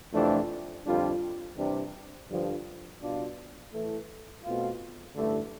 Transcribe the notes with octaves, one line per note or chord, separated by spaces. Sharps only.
F2 C3 E3 A3 D4
F2 D3 G3 D4 F4
C3 E3 G3 D4 G4
G2 D3 F3
B2 G3 D4 F4
A2 E3 A3
B2 A3 C4 F4
A1 G2 D3 A3